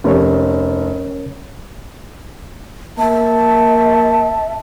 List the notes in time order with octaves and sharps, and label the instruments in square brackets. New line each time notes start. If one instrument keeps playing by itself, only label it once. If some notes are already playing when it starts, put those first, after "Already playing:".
[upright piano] F1 [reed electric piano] C#4 A#4 C#5
[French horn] A#3 [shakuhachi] E5 [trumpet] A5